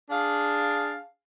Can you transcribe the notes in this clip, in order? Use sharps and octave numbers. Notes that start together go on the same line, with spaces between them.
D4 G#4 F5